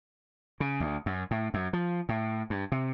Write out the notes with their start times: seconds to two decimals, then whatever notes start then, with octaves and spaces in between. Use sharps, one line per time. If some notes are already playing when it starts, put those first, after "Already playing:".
0.60 C#3
0.80 D2
1.06 F#2
1.31 A2
1.54 F#2
1.73 F3
2.09 A2
2.50 G2
2.72 C3